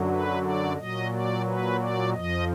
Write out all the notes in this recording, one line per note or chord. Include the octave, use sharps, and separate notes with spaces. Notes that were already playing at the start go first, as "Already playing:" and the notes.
Already playing: F#2 D3 F#3
B4
D5
A#2 F#3 D#5
D5
B4
D5
F2 F3 D#5